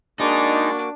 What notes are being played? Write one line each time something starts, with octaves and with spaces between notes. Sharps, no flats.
G#3 A#3 D4 D#4 F#4 G#4 D5 D6